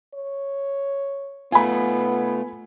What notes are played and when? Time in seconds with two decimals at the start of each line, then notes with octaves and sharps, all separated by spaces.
0.14 C#5
1.52 A3 B3 F4 G#5 B5